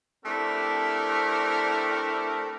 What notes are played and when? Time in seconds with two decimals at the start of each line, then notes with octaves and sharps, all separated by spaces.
0.25 A3 C4 D4 E4 G4 A#4